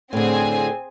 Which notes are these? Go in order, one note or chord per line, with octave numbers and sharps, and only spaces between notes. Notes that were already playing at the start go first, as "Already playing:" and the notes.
A2 D3 C4 G#4 G#5